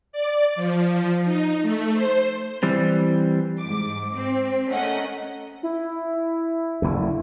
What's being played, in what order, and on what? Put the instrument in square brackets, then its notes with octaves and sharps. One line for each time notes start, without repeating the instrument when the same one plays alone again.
[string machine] D5
F3
D#4
A3
C5
[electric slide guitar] E3 G3 C4
[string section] G#2 D6
C4
A3 C#4 A#4 D#5 F#5
[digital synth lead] E4
[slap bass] F#1 D2